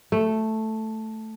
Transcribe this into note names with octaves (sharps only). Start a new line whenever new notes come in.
A3